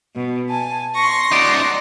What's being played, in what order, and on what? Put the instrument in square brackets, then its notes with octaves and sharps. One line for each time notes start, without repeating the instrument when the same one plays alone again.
[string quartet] B2
[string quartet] G#5 [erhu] A5
[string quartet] C6 A#6 [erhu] C#6
[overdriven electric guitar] D#4 D5 [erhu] F#5